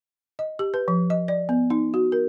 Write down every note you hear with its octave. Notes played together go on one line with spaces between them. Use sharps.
D#5
G4
B4
F3
D#5
D5
B3
D#4
F#4
A#4